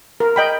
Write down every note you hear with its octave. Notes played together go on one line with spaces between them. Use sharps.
A#4
D#5 G5 B5